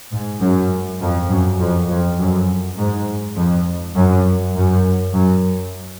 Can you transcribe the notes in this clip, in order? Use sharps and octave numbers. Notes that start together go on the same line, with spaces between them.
G#2
F#2
F2
F#2
F2
F2
F#2
G#2
F2
F#2
F#2
F#2